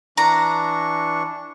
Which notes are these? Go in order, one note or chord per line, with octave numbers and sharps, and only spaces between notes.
E3 D4 A#5 C#6